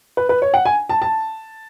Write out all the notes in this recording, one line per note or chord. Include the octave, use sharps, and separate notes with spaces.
B4
B4
C#5
F#5
G#5
A5
A5